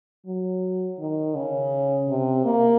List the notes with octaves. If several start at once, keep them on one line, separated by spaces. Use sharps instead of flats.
F#3
D#3
C#3
C3
A#3